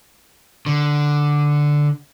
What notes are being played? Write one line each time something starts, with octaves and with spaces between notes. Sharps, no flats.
D3